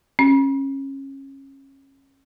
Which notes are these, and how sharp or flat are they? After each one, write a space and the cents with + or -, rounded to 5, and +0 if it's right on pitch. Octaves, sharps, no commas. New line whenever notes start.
C#4 -25